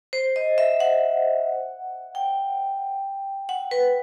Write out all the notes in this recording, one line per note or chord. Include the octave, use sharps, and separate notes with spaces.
C5
D#5
E5
F#5
G5
F#5
B4